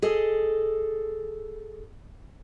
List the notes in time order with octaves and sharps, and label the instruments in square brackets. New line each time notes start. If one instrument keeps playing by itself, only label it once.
[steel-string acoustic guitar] G#4 A4 D#5